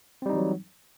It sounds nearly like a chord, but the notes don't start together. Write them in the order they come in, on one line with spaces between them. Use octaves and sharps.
C4 G3 D#4 E3 F#3